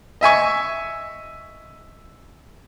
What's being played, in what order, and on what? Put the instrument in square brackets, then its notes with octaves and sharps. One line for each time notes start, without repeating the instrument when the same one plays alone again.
[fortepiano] D#5 E5 G#5 C#6